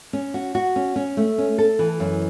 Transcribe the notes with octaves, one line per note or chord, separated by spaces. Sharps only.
C#4
F#4
F#4
C#4
C#4
A3
C#4
A4
E3
F#2